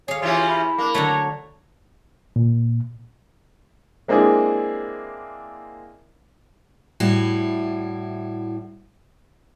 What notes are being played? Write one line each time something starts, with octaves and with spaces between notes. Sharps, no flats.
G#4 C#5 F5
C3 E3 C#4 F4 C#5
E4
A#3 D4
D3 F#3 A3 C#5
A#2
G#3 A#3 C4 D4 E4 G#4
A2 G3 E4 F#4